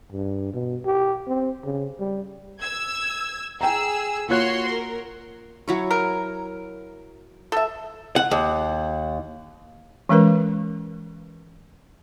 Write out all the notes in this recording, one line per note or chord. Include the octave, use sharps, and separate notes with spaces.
G2
B2
G4
C4
C#3
G3
E6 G#6
G#4 G5 A#5 E6
A#3 F4 F#4 C#5 C6 F#6
A#4
F#3 E4 C#5
A#4
A4 E5
F#5
D#2
E3 G#3 C#4 A#4 B4